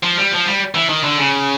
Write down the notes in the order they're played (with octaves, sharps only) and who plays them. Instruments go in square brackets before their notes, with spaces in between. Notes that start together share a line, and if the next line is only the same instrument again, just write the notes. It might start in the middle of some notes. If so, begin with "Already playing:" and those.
[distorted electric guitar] F3
G3
F3
G3
E3
D#3
D3
C#3